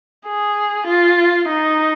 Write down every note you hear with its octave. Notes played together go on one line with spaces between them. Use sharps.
G#4
F4
D#4